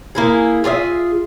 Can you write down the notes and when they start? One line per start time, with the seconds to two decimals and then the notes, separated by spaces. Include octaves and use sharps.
0.15 A#3 E4 G#4
0.64 F4 G#4 D5 E5